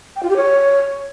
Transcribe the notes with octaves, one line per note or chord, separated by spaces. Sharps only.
G5
F4
G4
C#5